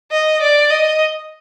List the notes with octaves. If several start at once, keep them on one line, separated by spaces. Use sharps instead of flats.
D#5
D5
D#5